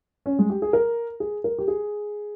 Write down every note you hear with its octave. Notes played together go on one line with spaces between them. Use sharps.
C#4
G#3
G4
G#4
A#4
G#4
A#4
G4
G#4